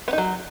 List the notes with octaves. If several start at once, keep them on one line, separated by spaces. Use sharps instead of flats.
B3
D#4
F#3